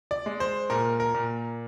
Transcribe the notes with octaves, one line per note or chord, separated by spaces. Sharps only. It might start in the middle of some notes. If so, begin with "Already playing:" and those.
D5
G#3
C5
A#2 A#4
A#4
A#2